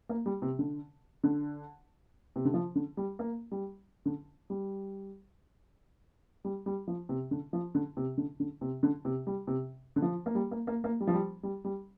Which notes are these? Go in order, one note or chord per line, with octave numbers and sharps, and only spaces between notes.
A#3
G3
C3
D3
D3
C3
D3
F3
D3
G3
A#3
G3
D3
G3
G3
G3
F3
C3
D3
F3
D3
C3
D3
D3
C3
D3
C3
G3
C3
D3
F3
A#3
G3
A#3
A#3
A#3
G3
F3
G3
G3
G3